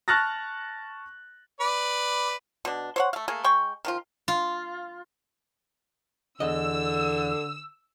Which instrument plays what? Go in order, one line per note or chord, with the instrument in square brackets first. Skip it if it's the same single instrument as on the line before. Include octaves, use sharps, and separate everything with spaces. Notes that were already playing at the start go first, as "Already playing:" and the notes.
[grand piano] A5 C#6 F6 F#6 A6 A#6
[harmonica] B4 D5
[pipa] B2 D4
C5 C#5 F#5
A3 F5
A3 A#3 G#4
G#3 G5 C#6
D#3 F3 F4
[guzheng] F4
[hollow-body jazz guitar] E2 D#5 [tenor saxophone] D3 [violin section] E6